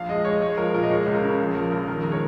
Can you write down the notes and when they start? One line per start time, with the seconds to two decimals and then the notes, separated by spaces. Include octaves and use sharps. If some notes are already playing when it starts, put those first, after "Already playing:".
Already playing: A#1 F5
0.09 G#3 D#5
0.25 G#3 C#5
0.41 G#3 C#5
0.57 F3 A#4
0.74 A#2 A#4
0.83 D#5
0.90 G#3 C#5
1.06 C#2
1.15 A#4
1.23 C#3
1.39 A#1
1.55 A#1 A#4
1.71 A#1 A#4
1.88 D#3 A#4
2.04 G#3 A#4
2.12 C#5